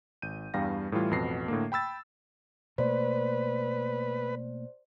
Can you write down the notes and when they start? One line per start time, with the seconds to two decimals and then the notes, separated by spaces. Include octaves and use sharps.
0.22 G#1 G6 D#7
0.54 E2 G2 G3 F5 G5 A#6
0.92 A2 E3 G3 F4
1.11 A1 F2 B2 B3 A#6 C7
1.48 A2 D3 A#3
1.72 G5 B5 E6 A6
2.78 B2 A3 A#3 B4 C5 D5